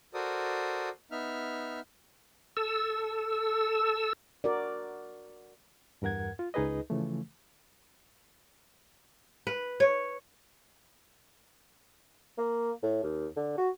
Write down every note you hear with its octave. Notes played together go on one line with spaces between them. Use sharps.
F#4 A4 A#4 C5 D5 D#6
B3 D#4 E5 F6
A4 E6
F#4 A#4 D5
E2 G2 A#4 F#5 G#6
F4
C#2 D#4 G#4 B4 D#5
C#3 E3 F3 A3
B4
C#5
A#3
A2
D#2
D3
F#4